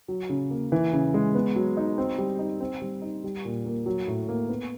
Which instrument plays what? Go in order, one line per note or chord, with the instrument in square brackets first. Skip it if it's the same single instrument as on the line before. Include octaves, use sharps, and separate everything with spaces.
[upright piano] F#3
C#3
A#3
E3
C#3
G#3
B3
F#3
D#4
C4
G3
D#4
C4
G3
D#4
G3
A#2
A#3
F#3
A2
A#3
B3